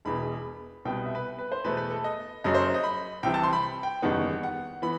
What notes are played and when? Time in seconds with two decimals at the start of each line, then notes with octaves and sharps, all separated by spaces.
0.05 E1 E2 B2 B5
0.85 C2 B2 G3 B3 G5
1.05 E5
1.15 B4
1.39 B4
1.52 C5
1.64 E2 B2 A3 B4
1.77 B4
1.90 A4
2.04 D#5
2.44 F#1 F#2 F#3 D#5
2.54 C5
2.74 D#5
2.84 B5
3.23 C2 C3 E3 G5
3.34 A5
3.43 C6
3.53 B5
3.83 G5
4.02 F#1 E2 D#3 G3 B3 F#5
4.43 F#5
4.82 E3 B3 B5